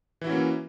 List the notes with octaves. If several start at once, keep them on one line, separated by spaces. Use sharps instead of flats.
E3 A#3 C#4 E4 F#4